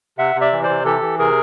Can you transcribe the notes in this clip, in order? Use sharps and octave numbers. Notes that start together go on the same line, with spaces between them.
C3 E5 F#5
C3
D5 E5
E3
C5 D5
C3
E3 G4 A4
E3
C3 G#4 A#4